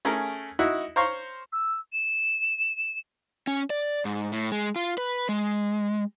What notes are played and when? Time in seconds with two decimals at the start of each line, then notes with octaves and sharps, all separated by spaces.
0.05 A3 C#4 G#4 A#4
0.59 D#4 E4 F#4
0.96 C5 C#5 F5 A#5 C6 C#6
1.52 E6
1.92 E7
3.47 C#4
3.70 D5
4.05 G#2
4.32 A2
4.52 G#3
4.76 F4
4.98 B4
5.29 G#3